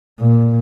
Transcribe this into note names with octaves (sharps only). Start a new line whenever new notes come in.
A#2